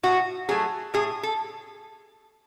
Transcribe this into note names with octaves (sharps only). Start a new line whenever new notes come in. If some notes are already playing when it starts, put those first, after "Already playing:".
A2 F#4
F#3 A3 G#4
A2 G#4
A4